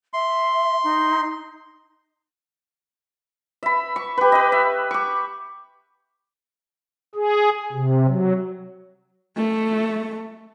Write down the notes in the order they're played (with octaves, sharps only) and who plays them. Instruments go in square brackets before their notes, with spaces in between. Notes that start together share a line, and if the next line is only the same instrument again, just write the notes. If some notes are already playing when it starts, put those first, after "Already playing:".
[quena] E5 [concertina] C6
[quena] D#4
[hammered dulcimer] E5 B5
C#6
G4 B4
B4 D#5
E5
C#6 D6
[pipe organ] G#4
C3
F#3
[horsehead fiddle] A3